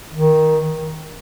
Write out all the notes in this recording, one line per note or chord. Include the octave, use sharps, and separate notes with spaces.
D#3